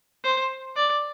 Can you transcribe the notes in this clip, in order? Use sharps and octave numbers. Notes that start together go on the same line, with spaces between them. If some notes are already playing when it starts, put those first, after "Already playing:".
C5
D5